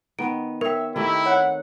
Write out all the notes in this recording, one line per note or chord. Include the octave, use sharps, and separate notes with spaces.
D#3 B3 D7
A#4 C#5 E5 G5
D#3 A3 C4 E4 G4
C#5 F#5